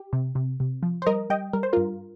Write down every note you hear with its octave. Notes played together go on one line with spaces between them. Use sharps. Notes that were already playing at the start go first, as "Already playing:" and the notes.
Already playing: G4
C3
C3
C3
F3
C5
G3 A#4 D#5
G3 D#5 G5
G3 A#4
C5
G2 F4 A#4